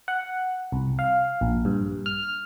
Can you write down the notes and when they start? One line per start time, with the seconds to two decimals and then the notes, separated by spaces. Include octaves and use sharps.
0.08 F#5
0.72 C2
0.99 F5
1.41 A#1
1.65 G2
2.06 F6